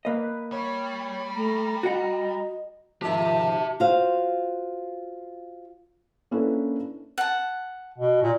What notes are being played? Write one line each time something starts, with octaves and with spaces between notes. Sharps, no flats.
A#3 B4 D#5
G3 C#5
A3 A#5
F#4 D#5 F#5 A#5
G#2 D#3 F3 G4 E5 A5
F4 F#4 C5 F5
A#3 C#4 D4 E4 A4 B4
F#5 A5
B2
A#2